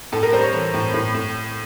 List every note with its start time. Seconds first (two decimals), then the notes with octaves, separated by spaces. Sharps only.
0.12 A2 A4
0.23 A#4
0.32 G3 C5
0.43 C#5
0.53 E3
0.74 A2
0.93 A2
1.14 A2